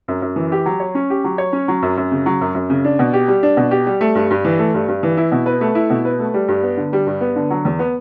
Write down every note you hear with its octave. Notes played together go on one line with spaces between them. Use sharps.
F#2
F#2
E3
G4
F#3
C#5
C#4
G4
F#3
C#5
C#4
F#3
F#2
F#2
C#3
F#3
F#2
F#2
C#3
D4
B2
G4
G3
D4
B2
G4
G3
A3
G2
G2
E3
A3
G2
G2
E3
E4
B2
B4
A3
E4
B2
B4
A3
G3
G2
B3
D3
G3
G2
B3
D3
F#3
E2
B3